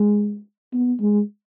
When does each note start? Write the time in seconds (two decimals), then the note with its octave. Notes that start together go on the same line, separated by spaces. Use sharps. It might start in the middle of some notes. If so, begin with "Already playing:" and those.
Already playing: G#3
0.73 B3
1.00 G#3